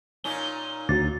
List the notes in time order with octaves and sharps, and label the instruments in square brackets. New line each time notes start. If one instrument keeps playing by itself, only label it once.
[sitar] A#2 C#4 D#4 [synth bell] G7
[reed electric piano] D2 [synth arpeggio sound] D4 F#4 [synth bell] A6